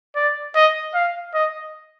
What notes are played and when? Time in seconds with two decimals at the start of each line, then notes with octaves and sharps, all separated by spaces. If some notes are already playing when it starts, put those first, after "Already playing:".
0.15 D5
0.55 D#5
0.94 F5
1.34 D#5